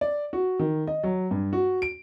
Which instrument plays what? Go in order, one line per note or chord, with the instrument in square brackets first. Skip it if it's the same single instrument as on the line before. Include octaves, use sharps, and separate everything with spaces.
[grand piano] D5
F#4
D#3
D#5
F#3
G2
F#4
D7